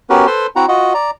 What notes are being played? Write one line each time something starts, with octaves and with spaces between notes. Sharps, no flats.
B3 C#4 F#4 G4 A#4 B4
A4 B4 C5 C6
C4 E4 F#4 F#5 A#5
F4 F#4 D#5 F#5
D5 A#5